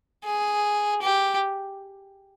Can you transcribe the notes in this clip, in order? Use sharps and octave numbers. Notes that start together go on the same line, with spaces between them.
G#4
G4